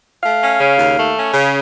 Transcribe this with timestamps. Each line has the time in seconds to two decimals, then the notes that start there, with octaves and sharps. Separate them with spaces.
0.24 A3 F5
0.42 C#4
0.60 C#3
0.79 D#2
0.97 A3
1.16 C#4
1.33 C#3